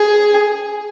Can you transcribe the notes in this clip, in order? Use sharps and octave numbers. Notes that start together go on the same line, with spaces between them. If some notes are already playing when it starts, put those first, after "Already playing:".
Already playing: G#4